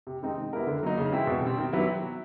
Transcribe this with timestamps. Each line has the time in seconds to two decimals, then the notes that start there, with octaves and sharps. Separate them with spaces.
0.07 C3
0.22 D#3 G#3 C4 D#4
0.38 G#3
0.53 B3 E4 G4 A#4
0.67 D3
0.83 F#3 A#3 D#4
0.98 C#3
1.12 E3 G#3 C4 E4
1.27 B2
1.42 G3 C4
1.58 D#3
1.72 F#3 B3 E4 G4